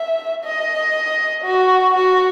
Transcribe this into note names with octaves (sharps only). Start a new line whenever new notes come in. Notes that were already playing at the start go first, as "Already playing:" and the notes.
Already playing: E5
D#5
F#4
F#4